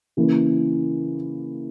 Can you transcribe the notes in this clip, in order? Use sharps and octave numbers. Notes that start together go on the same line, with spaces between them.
C#3 E3 A#3